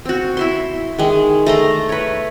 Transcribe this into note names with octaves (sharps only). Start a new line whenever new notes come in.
C4 F#4
E4 E5 C6
D#3 G#3
A3 A#5 C6
B4 C#5